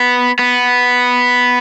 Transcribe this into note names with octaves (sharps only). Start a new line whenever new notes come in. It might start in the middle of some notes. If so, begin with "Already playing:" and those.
Already playing: B3
B3